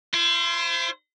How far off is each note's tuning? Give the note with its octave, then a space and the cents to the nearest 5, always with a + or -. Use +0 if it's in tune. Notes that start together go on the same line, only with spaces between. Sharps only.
E4 +45 C5 +0